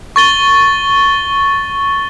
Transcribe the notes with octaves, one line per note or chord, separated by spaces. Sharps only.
C#6 A6 G7